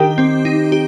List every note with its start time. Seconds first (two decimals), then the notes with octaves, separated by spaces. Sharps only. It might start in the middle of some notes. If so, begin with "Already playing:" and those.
Already playing: D#3 G4
0.18 C4
0.45 D#4
0.72 G4